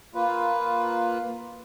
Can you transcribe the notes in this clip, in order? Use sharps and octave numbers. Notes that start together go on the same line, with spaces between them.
A#3 F4 B4